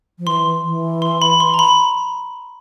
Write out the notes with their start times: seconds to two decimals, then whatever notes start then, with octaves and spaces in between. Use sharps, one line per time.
0.18 F3
0.26 E3 C6
0.65 E3
1.02 C6
1.22 B5
1.40 C6
1.54 A#5
1.59 B5